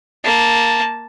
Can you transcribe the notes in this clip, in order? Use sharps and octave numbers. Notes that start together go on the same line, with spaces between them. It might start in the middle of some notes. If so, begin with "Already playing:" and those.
A#3 A5